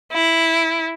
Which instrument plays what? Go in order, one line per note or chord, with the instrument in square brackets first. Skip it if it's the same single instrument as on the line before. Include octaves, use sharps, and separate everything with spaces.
[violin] E4